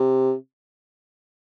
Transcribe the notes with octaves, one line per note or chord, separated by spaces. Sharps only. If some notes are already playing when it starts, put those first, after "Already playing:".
Already playing: C3